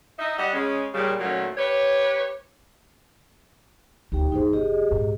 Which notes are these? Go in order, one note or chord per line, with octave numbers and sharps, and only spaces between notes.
D#4 E5
G3 D#5 F#5
C#3 G#3 C#4
A#2 C#3 G3
A#2 D#3 F#3 A3 C#4
G4 B4 C#5
D#1 D2 D#4 G4 G5
G2 A#3 D#4 G#4 C5
F1 G4 G#4 D#5
A#1 G#2